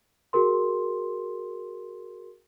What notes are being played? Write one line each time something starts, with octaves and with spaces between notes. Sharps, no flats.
F#4 G#4 A#4 C6